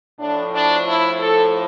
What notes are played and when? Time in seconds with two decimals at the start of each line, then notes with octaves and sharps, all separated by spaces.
0.19 A2 F3 D4
0.53 D4
0.86 E4
1.20 A4